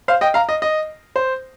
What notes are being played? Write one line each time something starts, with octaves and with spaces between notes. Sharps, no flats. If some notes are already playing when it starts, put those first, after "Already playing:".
C5 F5
D#5 G5
F5 A#5
D#5
D#5
C5